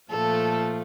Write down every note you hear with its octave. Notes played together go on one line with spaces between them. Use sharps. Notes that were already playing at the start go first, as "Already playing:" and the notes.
A#2 F3 A3 A4